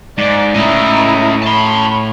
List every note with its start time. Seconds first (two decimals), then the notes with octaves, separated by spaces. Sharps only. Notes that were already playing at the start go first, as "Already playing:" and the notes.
0.18 G#2 D5
0.55 A2 C#4 E4 D#5 A#5
1.43 C#5 A5 B5 C6